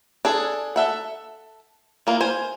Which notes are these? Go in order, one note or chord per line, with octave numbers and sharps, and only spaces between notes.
D4 G#4 A4
A4 E5 F#5
E3 A#3 F4
C5 G#5